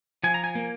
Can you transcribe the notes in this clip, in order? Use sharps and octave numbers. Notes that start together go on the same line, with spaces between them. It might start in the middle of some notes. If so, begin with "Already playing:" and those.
F3 G#5
A#5
G#5
A#3